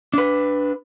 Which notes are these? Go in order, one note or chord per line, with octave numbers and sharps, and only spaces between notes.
D4 B4